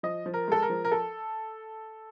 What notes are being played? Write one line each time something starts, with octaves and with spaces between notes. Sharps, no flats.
F3 D#5
F3
A#4
G#3 A4
A#4
F3
A#4
A4